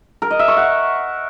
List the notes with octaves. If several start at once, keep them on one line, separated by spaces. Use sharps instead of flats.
A#4
D#5
E5
C#6
F#5